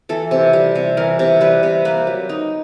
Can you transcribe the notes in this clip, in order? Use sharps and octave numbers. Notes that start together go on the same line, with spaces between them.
E3 A4
C3
G3
C3
E3 A#4
C3
G3 B4
C3
A#3 B4
F#3
D#4